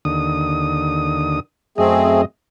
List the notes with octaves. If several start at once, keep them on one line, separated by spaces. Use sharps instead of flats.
D#2 D3 D#6
F#2 A3 C4 G#4 D#5